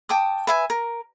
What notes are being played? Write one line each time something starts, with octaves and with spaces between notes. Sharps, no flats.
G5 A5 D6 D#6
B4 E5 G#5
A#4